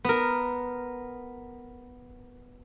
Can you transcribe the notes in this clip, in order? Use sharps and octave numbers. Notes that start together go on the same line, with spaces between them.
B3 A#4